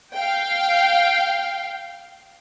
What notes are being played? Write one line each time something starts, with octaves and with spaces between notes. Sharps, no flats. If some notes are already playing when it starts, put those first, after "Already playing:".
F5 G5